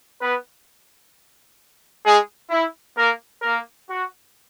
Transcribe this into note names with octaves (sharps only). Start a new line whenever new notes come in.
B3 B4
G#3 G#4
E4
A#3 A#4
A#3 A#4
F#4